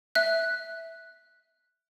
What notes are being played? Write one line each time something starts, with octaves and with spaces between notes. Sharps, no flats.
E5 F#6